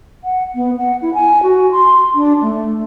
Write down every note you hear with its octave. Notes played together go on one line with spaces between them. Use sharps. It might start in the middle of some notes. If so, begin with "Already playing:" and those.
F#5
B3
F#5
E4
G#5
F#4
C6
D4
A3